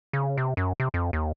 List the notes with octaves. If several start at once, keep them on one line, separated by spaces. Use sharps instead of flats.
C#3
C3
F#2
C3
F2
D#2